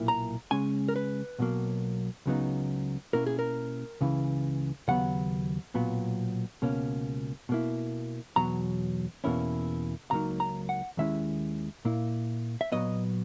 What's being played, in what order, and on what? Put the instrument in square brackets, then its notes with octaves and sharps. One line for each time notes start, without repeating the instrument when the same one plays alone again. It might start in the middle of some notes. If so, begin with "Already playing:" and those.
Already playing: [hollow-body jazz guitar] B1 A#2 A#3 E4
A#5
C#3 G#3 C#4 G#5
A#4
B4
B1 B2 F#3 A#3
C#2 C#3 F#3 B3 D#4
B2 A#3 C#4 E4 A#4
G#4
A#4
C#2 C#3 E3
D#2 C#3 F#3 B3 F#5
B1 A#2 F#3 B3
C#2 B2 A#3 C#4
B2 A#3 E4
E2 B2 F#3 A#5
E2 B2 A#3 C#4 E4
C#2 B2 F#3 A#3 D#4 A#5
A#5
F#5
D#2 D#3 G#3 C#4 E4 E5
A#2 A#3 E4
E5
A#2 F#3 B3 D#5